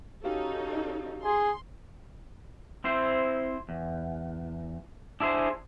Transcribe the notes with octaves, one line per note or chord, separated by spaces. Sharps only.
C#4 D#4 F#4 G4 A4 F5
G#4 C6
C4 E4 C5
E2
D4 E4 G#4 C5